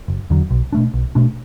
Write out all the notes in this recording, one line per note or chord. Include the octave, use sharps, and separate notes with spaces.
F#1
E2 D3 F#3
B1
B2 A3 D4
B1
B2 A3 D4